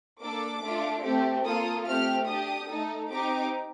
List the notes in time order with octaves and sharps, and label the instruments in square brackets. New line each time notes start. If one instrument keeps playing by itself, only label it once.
[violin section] A#3 D4 A4 D6
A3 D4 F4 A4
A3 C4 G4
A#3 F4 A4 D#6
A3 C4 G4 F6
D4 G4 D#6
A3 D#4 A4
C4 D#4 G4 D6